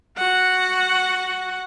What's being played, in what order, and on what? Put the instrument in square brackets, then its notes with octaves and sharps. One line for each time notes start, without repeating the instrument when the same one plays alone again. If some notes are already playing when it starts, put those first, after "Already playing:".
[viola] F#4 F#5